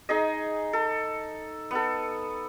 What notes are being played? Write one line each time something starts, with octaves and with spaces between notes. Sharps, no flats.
D#4 G#4 D#5
A4
B3 A4